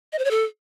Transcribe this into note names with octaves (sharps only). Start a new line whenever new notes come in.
D#5
C5
C#5
A4